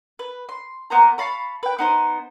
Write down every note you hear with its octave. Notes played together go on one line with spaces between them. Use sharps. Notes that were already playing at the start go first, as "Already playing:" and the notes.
B4
C6
A#3 B3 C5 A#5
F5 A5 B5 C#6
B4 G5
B3 D#4 C5